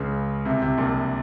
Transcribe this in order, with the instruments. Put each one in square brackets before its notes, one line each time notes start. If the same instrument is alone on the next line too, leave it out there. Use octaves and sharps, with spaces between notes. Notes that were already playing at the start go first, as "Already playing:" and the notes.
Already playing: [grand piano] C#2 C#3
C2 C3
C2 C3
A#1 A#2